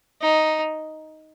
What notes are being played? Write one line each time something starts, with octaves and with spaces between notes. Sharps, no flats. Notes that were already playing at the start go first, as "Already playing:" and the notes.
D#4